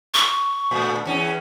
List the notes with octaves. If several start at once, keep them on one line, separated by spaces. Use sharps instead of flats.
C#6
A#2 A3
E2 C#4